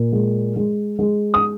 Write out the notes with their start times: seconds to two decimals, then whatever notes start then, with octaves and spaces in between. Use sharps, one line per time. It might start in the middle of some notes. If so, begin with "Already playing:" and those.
Already playing: A#2
0.12 G#3
0.56 G#3
0.99 G#3
1.34 D#6